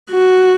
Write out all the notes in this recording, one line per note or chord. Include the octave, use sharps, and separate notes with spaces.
F#4